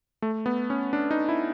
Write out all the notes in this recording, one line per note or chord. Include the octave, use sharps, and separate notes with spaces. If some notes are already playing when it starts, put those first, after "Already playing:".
A3
B3
C#4
D4
D#4
E4